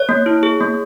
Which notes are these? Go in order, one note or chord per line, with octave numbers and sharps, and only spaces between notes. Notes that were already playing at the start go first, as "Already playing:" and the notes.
Already playing: C#5
A#3
E4
G#4
A#3